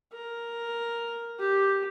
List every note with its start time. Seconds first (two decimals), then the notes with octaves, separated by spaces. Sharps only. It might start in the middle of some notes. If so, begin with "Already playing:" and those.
0.13 A#4
1.39 G4